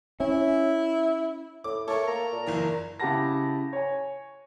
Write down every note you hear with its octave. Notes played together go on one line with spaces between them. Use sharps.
C#4 E4
A2 D6
A3 A4 A#4 C#5 C#6
A#3 A#5
A#2
F#1 E3 A#4
C#3 E4 G4 F#5 A5 A#6
C#5 G#5